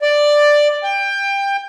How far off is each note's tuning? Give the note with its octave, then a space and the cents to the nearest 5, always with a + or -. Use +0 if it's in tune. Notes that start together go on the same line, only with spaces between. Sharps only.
D5 +5
G5 +20